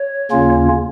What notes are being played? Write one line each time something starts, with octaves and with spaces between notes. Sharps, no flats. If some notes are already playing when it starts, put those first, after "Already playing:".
Already playing: C#5
D#2 C#3 A#3 C#4 F4